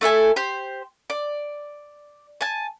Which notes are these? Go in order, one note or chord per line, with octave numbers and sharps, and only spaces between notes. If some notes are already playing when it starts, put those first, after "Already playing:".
A3 E4 A4 G#5
G4 C5
D5
G#5 A5